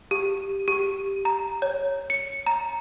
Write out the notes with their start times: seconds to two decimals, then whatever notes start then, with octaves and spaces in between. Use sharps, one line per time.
0.11 G4
0.68 G4
1.25 A#5
1.62 C#5
2.10 C#7
2.46 A#5